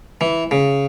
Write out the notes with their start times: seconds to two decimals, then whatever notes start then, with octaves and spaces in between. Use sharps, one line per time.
0.21 E3
0.51 C#3